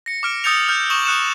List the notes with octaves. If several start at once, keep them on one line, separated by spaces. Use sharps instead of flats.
A#6 C#7
D6 F6 D7
D#6 E6 G6 A6 C#7 F7
F6 G6
C#6 D#6 E7 F#7
D#6 F#6 C#7 E7